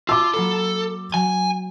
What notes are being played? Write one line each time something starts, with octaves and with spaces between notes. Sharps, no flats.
F4 A5 D6 E6
F#3 A#3 A4 B5
F#3 G#5